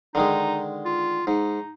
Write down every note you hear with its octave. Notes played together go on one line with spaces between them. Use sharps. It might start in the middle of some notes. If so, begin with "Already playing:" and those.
D3 D#3 G#3 D#4
F4
G#2 D#4